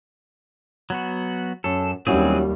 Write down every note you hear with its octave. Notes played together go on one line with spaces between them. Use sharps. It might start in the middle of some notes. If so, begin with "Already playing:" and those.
F#3 B3 F#4
F#2 A4
D#2 F#3 G3 C4 C#4 E4 F#4 G#4